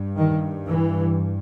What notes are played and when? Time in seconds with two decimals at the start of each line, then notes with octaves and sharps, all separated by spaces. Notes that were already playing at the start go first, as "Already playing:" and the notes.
Already playing: G2
0.18 D#3
0.72 E3